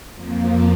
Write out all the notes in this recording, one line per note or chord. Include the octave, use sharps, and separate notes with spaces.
F2 F3 A#3